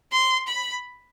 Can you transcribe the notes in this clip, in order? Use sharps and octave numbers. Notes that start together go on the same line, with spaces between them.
C6
B5